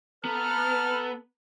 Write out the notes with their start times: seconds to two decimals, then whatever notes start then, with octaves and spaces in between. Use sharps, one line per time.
0.25 B3 A4 B4 A#5 F6